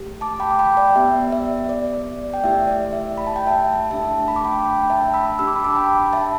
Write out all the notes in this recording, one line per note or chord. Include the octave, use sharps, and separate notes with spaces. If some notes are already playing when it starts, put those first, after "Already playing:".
Already playing: A3 G4
A5 D6
G5 B5
D6
G5 B5
D5 G5
B3 G4 E5
D5
E5
D5
G5
A3 E4 G4 E5
D5
E5
B5
A5
G5
E5 A5
A3 D4 G4 E5 A5
B5
D6
G5 B5
G5 B5
G5
E5 A5
B5 E6
D4 G4 E6
D6
B5
A5 D6
G5 B5
B5
E5 A5